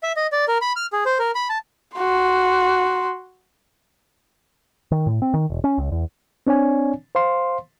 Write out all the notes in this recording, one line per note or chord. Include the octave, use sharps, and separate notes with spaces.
E5
D#5
D5
A#4
B5
F6
G#4
C5
A#4
B5
A5
F#4 C6
D#3
A2
C4
D#3
E1
C#4
C#2
E2
C4 D4 C#5 D5 G#5
C5 F5 C6